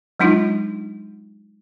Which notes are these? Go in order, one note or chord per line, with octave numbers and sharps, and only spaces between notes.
F#3 G#3 D4 D#4 F4